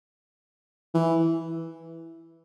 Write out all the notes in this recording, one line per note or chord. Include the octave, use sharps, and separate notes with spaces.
E3